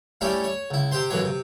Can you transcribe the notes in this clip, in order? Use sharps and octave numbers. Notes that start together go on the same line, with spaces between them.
G3 A3 C#4 E4 G4 A4
C#5
C#2 E4
C3 G4 C5 C6
A1 F#2 B2 E3 F#3 C#5
C3